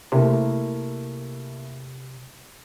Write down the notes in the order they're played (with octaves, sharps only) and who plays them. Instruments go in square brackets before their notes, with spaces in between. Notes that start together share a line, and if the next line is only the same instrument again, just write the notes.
[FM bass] C3 [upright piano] A3 A#3 E4